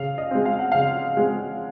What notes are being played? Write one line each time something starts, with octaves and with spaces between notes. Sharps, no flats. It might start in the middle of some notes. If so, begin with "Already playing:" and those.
Already playing: C#3 F5
D#5
G#3 C4
F5
F#5
C#3 F5
G#3 C4